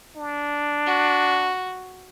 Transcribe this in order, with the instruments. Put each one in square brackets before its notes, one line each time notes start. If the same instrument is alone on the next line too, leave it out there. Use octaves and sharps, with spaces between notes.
[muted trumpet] D4
[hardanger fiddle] F#4